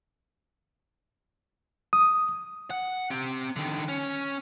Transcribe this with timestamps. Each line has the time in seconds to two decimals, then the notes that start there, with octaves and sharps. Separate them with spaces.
1.93 D#6
2.70 F#5
3.11 C4 G4
3.56 D3 D#3
3.88 C#4